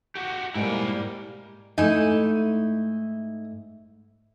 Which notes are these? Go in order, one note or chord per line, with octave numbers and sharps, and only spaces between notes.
F#4 G4
G#2 G3 A#3 E4 G5
G#2 A3 D#4 E4 G#5